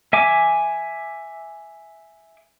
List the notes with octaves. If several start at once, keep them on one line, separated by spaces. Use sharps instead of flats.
E5 G#5 D6